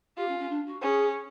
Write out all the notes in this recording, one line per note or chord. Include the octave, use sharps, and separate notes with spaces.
F4 G4
C#4
C#4
D4
F#4
C#4 G#4